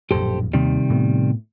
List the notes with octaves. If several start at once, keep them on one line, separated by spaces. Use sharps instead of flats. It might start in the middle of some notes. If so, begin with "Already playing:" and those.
A#1 F#2 A2 G4 A4 C5
D#2 C3 D#3 G3
A2 A3 B3